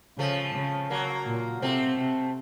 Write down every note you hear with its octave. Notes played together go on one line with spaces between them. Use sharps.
C#3 F3 A3
C#3
F#3 A#3
A#2
C3 A3 C4
C3